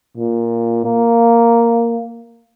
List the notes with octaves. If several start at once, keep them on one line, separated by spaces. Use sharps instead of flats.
A#2
A#3